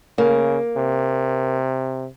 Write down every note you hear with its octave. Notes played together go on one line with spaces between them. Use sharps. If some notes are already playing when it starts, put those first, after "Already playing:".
C#3 A#3
C3